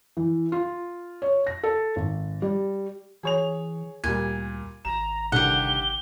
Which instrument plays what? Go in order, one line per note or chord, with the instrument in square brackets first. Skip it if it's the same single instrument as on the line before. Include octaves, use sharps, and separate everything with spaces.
[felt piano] E3
F4
C#5
A#6
A4
G#1
G3
[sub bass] E3 [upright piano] G#4 C#5 F7
[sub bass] D2 [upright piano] A#2 G3 [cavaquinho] G#5
[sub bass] G#1 [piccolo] A#5 [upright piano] E7
[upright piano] C2 D3 D#3 [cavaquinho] G4 F#5 [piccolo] G7